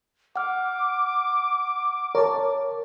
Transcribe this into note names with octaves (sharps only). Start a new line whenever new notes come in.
F#5 D6 F6
A#4 C#5 A5